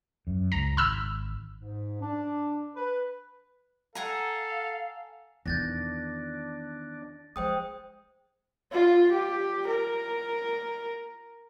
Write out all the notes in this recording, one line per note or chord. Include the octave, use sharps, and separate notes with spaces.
F#2
C#2 A#5
G#1 B5 E6 F6
G#2
D4
B4
A4 F5 F#5 G#5 A#5
E2 D#3 D4 G6 A6 A#6
F3 G#3 C5 G5 D#6
F4
G4
A#4